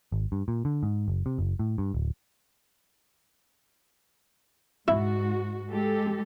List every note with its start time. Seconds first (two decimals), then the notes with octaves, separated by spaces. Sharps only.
0.12 G#1
0.32 G2
0.48 A#2
0.65 D3
0.83 G#2
1.08 F#1
1.26 C3
1.39 F#1
1.59 A2
1.78 G2
1.94 D1
4.88 G#2 E4 F#4
5.72 G#3 G4 A4